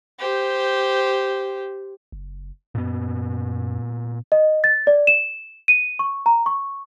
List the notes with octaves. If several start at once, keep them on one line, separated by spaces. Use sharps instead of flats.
G4 C5
F#1
F#2 A#2 B3
D#5
A6
D5
E7
D#7
C#6
A#5
C#6